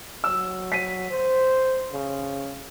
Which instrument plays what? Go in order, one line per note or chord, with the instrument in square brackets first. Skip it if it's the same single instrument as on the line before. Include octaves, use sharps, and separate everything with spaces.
[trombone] F#3 [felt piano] E6
[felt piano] B6 D#7
[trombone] C5
C#3